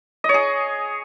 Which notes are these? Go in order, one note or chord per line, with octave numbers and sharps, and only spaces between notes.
D#5
C#5
G#4